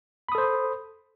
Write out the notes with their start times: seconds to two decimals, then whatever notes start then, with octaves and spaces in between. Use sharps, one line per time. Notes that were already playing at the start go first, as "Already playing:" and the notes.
0.29 B5
0.32 D#6
0.35 A4
0.38 C5